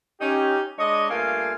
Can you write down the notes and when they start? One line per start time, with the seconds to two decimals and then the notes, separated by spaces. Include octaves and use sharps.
0.20 C#4 D#4 G4
0.78 G#3 D4 C#5 D#5
1.10 G2 A3 A#3 F4 F5 G#5